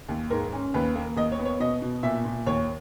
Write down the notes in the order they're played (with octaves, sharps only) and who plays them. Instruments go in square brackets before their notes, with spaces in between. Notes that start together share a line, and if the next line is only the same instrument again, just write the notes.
[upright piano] D#2
G#2 A#4
C#4
D#2 B4
A#3
D#2 D#5
C#5
B3
C#5
B2 D#5
B2
A#2 E5
A#2
D#2 C#5